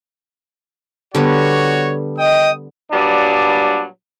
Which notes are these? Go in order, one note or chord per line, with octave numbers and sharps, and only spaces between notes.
D3 G3 B3 F#4 C#5
D#5 G5 D#6
A#2 F#3 G3 B3 D4